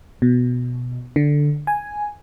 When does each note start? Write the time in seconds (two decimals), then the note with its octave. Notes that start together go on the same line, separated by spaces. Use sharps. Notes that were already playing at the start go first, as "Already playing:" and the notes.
0.22 B2
1.16 D3
1.67 G#5